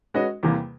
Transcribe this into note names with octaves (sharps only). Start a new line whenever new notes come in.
G#3 C#4 F#4 B4 D#5
E2 C3 E3 G3 A#3